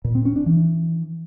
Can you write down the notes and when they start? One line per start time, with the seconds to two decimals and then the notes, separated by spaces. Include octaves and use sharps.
0.05 A#2
0.15 C4
0.25 C#4
0.36 D4
0.46 E3